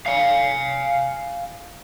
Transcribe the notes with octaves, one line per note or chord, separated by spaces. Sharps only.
F5 G#5